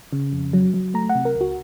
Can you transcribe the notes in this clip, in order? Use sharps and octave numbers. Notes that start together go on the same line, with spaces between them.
C#3
F2
F#3
F#3
A3 A#5
F#5
C3
A#4
C#2
F#4